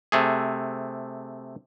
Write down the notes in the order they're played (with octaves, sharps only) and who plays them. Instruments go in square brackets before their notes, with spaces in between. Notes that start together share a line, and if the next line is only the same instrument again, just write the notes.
[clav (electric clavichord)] C3 A3 G#4